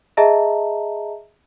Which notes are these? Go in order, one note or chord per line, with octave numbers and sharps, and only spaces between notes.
G#4 D#5 E5 A5 A#5